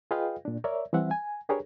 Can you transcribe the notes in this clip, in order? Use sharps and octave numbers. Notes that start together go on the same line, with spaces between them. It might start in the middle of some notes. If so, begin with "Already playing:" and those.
F4 G#4 B4 D#5 F5 G5
A#2 D4
A#4 C#5 D5 E5
E3 G3 C4 E5 F#5
G#5
D4 G4 G#4 A#4 B4 C#5